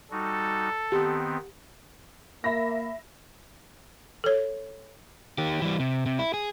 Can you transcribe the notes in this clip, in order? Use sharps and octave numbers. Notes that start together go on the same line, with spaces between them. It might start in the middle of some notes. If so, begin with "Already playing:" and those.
G3 D#4 F#4 A4
D#3 B3 C4 G4
A#3 E5 B5 A#6
A4 C#5
D#3 G4
E3 G3
C3
C3
E4
G#4